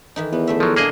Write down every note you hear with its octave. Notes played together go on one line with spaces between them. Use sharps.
D#3 E3 D#4
E2 B3
D#3 A3 E5
F3 F#3
A#2 A#3 D4 G#4 D#5 G#5